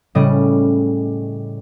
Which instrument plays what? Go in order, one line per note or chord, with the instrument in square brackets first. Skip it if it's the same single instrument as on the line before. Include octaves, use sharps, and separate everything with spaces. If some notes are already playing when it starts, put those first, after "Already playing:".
[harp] A2 C#3 G3 D#5